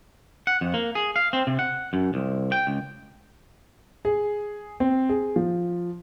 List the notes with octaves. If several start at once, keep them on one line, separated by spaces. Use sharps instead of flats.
F#5
F2
A#3
G#4
F5
C4
C3
F#5
F#2
C2
G5
C#2
G#4
C4
G#4
F3